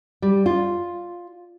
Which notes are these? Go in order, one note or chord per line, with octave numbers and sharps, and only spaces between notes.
G3
F4